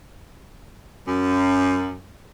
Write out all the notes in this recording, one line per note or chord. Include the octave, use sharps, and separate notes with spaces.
F#2